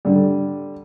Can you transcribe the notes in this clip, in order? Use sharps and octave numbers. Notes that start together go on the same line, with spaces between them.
D3 G3